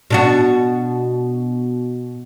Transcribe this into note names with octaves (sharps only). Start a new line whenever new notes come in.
B2 D4 F#4